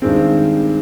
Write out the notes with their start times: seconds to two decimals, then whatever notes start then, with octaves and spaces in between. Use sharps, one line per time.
0.02 G2 D#3 G#3 C4